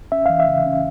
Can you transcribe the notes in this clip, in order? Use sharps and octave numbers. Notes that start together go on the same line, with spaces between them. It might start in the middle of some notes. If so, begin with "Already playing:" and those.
C#4 E5
E3 F5
E5
C#3
C#4